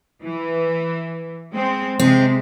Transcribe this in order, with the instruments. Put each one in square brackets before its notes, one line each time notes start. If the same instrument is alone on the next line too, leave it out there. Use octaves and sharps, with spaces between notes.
[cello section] E3
G#3 C4
[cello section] C3 G#3 [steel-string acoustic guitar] C4